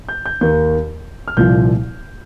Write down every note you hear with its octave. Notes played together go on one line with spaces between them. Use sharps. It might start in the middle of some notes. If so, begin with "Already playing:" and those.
G6
G6
D#2 D#3 G6
F6
C2 A#2 F3 G6